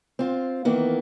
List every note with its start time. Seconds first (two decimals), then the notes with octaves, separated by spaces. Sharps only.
0.19 C4 F4
0.65 D#3 E3 A#3 B3